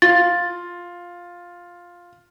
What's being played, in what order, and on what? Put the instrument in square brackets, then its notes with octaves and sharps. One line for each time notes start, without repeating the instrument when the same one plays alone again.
[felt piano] F4 [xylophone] A6